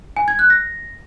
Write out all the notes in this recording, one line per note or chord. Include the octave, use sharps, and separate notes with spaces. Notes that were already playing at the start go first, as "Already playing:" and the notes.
G#5
G#6
F#6
A#6